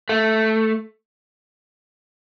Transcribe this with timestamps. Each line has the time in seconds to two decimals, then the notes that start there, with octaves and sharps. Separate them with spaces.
0.09 A3